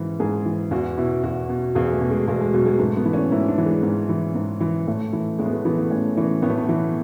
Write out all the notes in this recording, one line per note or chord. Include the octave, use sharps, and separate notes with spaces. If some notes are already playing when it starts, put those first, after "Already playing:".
Already playing: G#2 E3
G#2 G#4
E3
E2 F#4
B2 E4
E2 F#4
B2
E2 G#4
A3
B2
G#3
E2 G#3
G#3
B2 F#3
G#3
G#2 A3
B3
E3
C#4
G#2 E4
D4
E3
G#3
G#2
E3
G#2
E3
A2 A3
E3
A2 G#3
B3
A3
E3 B3
A3
A2 C#4
E3 C#4
A2 B3
A3
B3
E3